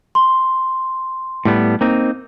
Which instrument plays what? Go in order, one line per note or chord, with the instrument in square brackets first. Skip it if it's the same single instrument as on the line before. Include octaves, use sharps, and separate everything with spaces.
[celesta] C6
[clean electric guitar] A2 G3 B3
A#3 C4 D#4